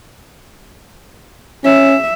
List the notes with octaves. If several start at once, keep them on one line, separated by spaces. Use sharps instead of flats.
C#4 E5